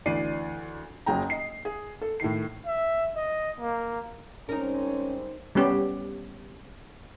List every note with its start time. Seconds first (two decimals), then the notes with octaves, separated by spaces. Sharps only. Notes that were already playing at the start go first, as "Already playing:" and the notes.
0.06 D2 E3 D5 C7 D#7
1.06 F#1 F#3 G#4 G5 A#5
1.30 D#5 C7
1.65 G#4
2.01 A4
2.20 A2 D#3 C7
2.66 E5
3.16 D#5
3.59 A#3
4.49 G3 G#3 C4 C#4 D#4 A#4
5.55 G3 B3 C#4 G4